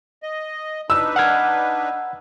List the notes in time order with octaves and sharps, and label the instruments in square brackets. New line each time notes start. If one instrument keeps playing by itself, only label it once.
[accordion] D#5
[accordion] D4 D#4 B4 [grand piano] E6
[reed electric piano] F#5 F6 G#6